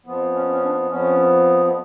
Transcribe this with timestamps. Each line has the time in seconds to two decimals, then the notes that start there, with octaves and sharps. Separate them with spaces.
0.06 F2 F3 B3
0.34 C#4
0.53 C#4
0.63 D4
0.90 F2 F3 B3 C#4
1.66 B3